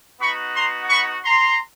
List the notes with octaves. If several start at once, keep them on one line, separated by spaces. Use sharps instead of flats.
B3 D#4 F#4 B5 C#6
A#5 C6
B5 C#6
A#5 C6